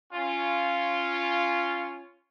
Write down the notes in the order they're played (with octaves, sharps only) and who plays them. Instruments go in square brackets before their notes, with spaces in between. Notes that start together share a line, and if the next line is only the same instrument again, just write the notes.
[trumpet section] C#4 F4